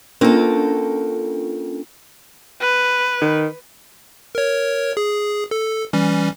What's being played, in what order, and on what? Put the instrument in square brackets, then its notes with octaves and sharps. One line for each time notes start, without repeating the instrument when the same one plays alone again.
[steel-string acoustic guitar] A#3 A4 [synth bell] C#4 D4 F4
[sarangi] B4
[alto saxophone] D#3
[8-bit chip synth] A#4 C#5
G#4
A4
E3 G3 C#4